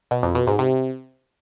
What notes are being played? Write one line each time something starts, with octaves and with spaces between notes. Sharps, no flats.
B2
F2
B2
G#2
C3